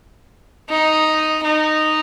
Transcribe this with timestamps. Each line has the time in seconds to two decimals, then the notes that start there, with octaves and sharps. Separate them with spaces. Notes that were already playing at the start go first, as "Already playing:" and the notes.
0.70 D#4
1.44 D#4